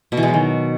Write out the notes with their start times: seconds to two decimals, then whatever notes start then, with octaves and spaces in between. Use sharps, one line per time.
0.12 B2
0.17 E3
0.23 G#3
0.28 F#3
0.34 D#3